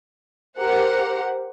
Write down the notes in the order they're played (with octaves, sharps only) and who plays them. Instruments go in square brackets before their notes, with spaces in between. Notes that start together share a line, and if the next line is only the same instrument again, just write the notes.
[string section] G4 A#4 C5 F#5